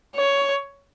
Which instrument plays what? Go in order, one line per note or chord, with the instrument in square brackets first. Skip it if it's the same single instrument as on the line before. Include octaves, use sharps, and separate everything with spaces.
[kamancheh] C#5